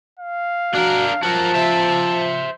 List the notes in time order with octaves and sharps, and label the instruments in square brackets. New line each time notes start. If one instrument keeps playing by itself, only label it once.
[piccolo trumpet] F5
[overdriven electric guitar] D4 A#4 [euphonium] F#4
[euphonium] F3 [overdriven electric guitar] F#4 A#4 [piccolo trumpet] A5
[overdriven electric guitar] C5 E5